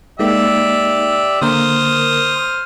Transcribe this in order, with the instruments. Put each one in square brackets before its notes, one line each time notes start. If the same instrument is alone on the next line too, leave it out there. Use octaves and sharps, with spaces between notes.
[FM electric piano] G#3 A#3 D#4 [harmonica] G4 D5 E5
[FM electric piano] D3 A#3 A#4 [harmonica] C5 D#6 F6